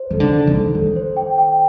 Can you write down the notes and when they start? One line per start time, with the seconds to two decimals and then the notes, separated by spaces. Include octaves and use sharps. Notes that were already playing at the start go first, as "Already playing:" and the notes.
Already playing: C5
0.11 D#3 A4
0.20 D3
0.33 A4
0.47 D#3
0.55 A4
0.75 D#3 A4
0.96 C5
1.17 G5
1.38 G5